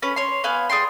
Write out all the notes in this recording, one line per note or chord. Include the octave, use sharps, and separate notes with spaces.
C#4 B4
C#5 C6
B3 F5 G#5
G#4 D5 G5 C6